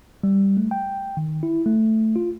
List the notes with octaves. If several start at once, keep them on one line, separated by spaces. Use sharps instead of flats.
G3
A3
G5
D#3
E4
A3
F4